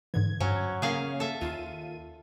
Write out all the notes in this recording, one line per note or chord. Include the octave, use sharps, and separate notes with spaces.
G#2 D3 E3 G#6
G2 F#3 C#4
C#3 A#3 C#4 G#4 F5
A4 E5
D#2 F4 D#7